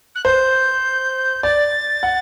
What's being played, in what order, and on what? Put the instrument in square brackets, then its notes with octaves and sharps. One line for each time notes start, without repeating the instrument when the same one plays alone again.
[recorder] F#6
[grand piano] C5 [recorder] G6
[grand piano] D5 [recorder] A6
[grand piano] F#5